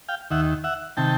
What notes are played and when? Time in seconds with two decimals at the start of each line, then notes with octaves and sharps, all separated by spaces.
0.08 F5 G5
0.30 D#2 D#3 E5 F#5
0.64 E5 F#5
0.97 C3 D#3 G5 A5